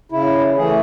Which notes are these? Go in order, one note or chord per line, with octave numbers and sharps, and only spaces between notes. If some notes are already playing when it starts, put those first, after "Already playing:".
C#3 E4
E3 A3 G#4